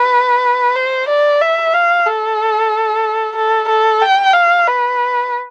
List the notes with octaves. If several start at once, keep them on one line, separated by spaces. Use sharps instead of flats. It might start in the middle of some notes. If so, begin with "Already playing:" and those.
Already playing: B4
C5
D5
E5
F5
A4
A4
A4
G5
F5
B4